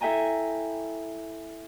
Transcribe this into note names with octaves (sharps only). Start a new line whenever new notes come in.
E4 A4 E5 G5 G#5 A#5